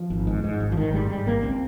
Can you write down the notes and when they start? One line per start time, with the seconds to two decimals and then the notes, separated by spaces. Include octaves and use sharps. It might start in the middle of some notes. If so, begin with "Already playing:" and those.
Already playing: F3
0.10 G#1
0.27 G#2
0.44 G#2
0.60 G#1
0.72 F3
0.76 G#1 D#3
0.93 G#2 G3
1.10 G#2 G3
1.26 G#1 A#3
1.43 C#2 C4